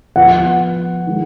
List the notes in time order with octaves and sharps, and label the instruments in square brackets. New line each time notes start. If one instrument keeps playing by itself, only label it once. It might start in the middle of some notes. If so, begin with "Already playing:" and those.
[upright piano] F3 B3 F4 [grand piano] F#5
[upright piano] D#3 G#3